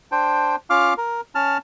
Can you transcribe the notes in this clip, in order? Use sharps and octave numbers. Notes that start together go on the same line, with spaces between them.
D4 C5 G5
C#4 F4 F5 D6 F6
A#4
C#4 A5 F6